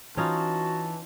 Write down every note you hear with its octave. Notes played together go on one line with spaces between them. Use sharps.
E3 C#4 D#4 F4 F#4 A5